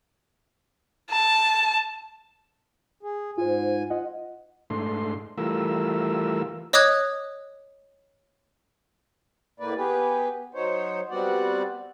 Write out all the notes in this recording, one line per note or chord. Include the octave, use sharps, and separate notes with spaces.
A5
G#4
G#2 F4 C5 G#5
F4 D#5 F#5
G#2 A3 D4 C6
E3 G3 A3 F4 A#4 E6
C#5 D#5 D6 D#6 F#6 G#6
A2 A#3 B4 D5
B3 G4 G#4 B4
F#3 D#4 C5 C#5
G3 B3 C4 F#4 D5 F#5